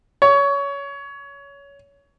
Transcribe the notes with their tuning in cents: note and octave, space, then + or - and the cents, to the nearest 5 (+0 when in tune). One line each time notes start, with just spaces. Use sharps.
C#5 +20